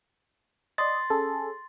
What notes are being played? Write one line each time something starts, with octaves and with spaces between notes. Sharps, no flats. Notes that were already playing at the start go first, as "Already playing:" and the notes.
D5 D#5 C6 A6
C#4 G#4 A4